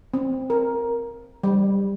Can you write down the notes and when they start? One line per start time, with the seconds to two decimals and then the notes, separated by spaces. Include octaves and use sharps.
0.14 C4
0.50 A#4
1.43 G3